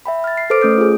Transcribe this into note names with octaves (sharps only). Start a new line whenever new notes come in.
E5 G5 B5
F6 A6
C7
A4 B4 C5 D6 F6 D7
A3 C#4 D#6 G6 D7
F4 G#4